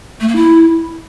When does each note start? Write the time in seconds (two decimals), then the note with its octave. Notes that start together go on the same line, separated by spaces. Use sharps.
0.20 A3
0.28 A#3
0.35 E4